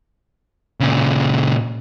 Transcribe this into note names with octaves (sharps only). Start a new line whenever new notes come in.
A#2 C#3